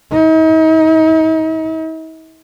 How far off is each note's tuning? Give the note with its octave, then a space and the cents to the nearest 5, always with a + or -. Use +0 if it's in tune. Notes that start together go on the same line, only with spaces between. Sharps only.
D#4 +40